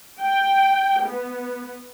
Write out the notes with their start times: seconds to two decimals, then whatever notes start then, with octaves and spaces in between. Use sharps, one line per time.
0.22 G5
1.04 B3